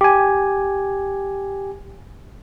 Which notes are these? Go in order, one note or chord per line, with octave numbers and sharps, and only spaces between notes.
G4 G#5